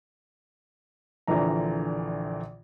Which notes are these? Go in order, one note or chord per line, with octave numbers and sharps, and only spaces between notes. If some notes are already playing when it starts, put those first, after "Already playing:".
A#1 A#2 D3 E3 A#5